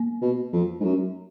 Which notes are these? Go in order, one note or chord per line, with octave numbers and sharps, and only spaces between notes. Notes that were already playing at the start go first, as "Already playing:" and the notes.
Already playing: A#3
B2
F2
G#2
F#2